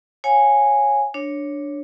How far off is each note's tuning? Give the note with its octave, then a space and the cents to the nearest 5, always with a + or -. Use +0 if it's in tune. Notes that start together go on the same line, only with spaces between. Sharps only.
C#5 -10 F5 +30 G#5 -5
D4 +0 C#5 +0